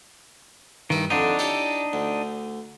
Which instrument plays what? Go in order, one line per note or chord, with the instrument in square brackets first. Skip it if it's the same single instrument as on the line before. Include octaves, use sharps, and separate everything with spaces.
[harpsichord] G2 E4 [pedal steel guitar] D#3
[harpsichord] F2 D3 [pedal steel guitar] D4 D#4
[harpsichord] E4 G4 C#5
D2